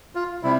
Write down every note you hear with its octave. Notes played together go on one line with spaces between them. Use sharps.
F4
C3 G3 E4